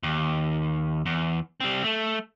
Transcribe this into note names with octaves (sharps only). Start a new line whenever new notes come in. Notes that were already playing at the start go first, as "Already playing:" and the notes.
D#2
E2
G3 C4
A3